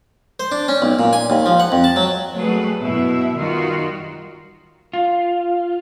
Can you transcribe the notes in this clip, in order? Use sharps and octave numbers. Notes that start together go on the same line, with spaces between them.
C5
D4
C#4
B1
A#2
G#5
D#2
F3
F#5
F2
A5
F#3
F#3 G3 A3 A#3 G#4 B4
F#2 B2 E4 E5
D#3 G3 D#4 F4 F#4
F4